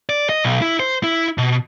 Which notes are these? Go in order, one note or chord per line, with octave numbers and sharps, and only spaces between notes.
D5
D#5
B1
E4
C5
E4
B2